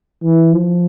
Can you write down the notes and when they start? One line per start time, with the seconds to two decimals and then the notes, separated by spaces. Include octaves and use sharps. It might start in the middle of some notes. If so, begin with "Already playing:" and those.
0.23 E3
0.53 F3